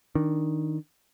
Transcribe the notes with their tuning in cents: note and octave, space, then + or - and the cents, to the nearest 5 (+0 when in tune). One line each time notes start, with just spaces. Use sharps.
D#3 +5 D4 +0